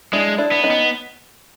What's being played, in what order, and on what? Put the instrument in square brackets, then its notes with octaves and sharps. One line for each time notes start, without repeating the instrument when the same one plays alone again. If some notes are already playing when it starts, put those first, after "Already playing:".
[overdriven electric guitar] G#3 [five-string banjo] D4 E4
[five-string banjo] D4 E4
[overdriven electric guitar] B3
[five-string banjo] C#4 D#4
[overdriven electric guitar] B3